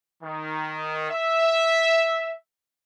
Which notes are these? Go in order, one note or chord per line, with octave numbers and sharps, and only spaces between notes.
D#3
E5